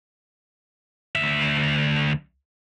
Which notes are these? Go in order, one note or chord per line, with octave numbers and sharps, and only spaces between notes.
D2 E5